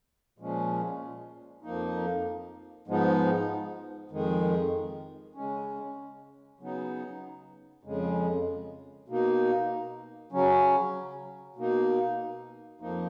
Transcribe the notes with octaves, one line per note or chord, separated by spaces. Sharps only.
A#2 F3 G#3 C#4
F2 F3 A#3 D#4
G#2 F3 G#3 B3 D#4
F2 D#3 G#3
C#3 G#3 C#4
C#3 F#3 B3 D#4
F2 C#3 G#3
B2 A#3 D#4
C#3 F#3 C#4
B2 A#3 D#4
F2 F3 A#3 D#4